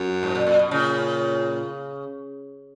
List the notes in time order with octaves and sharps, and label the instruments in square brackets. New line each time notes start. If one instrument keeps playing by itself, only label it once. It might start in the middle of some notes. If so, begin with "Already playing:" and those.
Already playing: [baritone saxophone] F#2
[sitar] G#2
A#2
A#2
B2
[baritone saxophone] A#2 [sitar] C#3